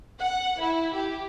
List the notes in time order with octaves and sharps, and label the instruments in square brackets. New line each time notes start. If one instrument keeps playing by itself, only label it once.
[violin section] F#5
E4
G4